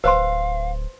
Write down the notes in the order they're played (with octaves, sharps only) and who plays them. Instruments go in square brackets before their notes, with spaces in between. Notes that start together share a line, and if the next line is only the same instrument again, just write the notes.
[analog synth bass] D1 [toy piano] B4 C5 C6 [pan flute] F5